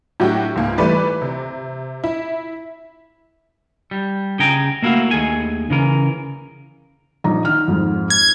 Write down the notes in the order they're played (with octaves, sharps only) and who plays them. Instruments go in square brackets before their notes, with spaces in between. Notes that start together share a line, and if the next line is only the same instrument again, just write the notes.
[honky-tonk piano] A2 F#3 D4 F#4 G4
C#2 G#2 A#3
E3 G3 A3 B4 D5
C3
E4
[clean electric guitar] G3
C#3 G#4 G5 A#5
A3 A#3 E4 F#4 F5
D#2 A3 G#4 G#5
C#3 E3 A#4
[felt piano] A#1 D#4 A#5
D#3 F6
F2 G#2
[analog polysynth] G#6